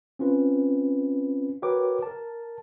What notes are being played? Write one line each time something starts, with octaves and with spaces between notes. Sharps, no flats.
C4 C#4 F4 B4
F#4 A#4 B4 C#5 G5 D6
A#4 A5